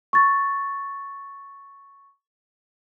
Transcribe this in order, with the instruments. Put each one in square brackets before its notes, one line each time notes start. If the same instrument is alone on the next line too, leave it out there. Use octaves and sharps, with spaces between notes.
[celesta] C#6 A6